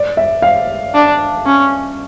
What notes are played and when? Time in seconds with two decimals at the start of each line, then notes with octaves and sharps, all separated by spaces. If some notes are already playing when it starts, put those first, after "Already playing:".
Already playing: D5
0.17 E5
0.42 F5
0.94 D4
1.46 C#4